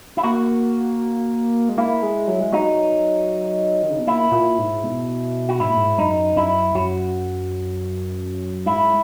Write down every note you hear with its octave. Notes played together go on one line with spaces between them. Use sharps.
E4
A#3 F#4
G#3
A#3 E4
G#3
F#3
G#3
F#3 D#4
D#3
C#3
B2
A#2 E4
A#2
G#2
B2
F#4
G#2 E4
A#2
G#2
F#2 D#4
F#2 E4
F#2 F#4
G#2 E4